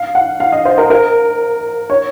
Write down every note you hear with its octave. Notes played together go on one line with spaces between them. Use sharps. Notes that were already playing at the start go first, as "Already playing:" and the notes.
Already playing: F5
F#5
F5
D#5
C5
A#4
A#4
C#5